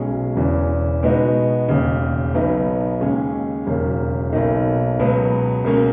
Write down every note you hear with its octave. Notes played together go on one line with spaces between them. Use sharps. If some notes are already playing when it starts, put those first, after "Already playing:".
Already playing: B1 B2 G#3 C#4 G#4
E1 E2 C#3 E3
B2 G#3 B3 D#4 F#4
E1 D#2 C#3
B1 B2 F#3 B3 D#4
D#2 C#3 G#3 C#4 G#4
E1 D#2 C#3 F#3 A#3
B1 B2 A#3 D#4
C#2 B2 F#3 B3
C#2 B2 A#3 C#4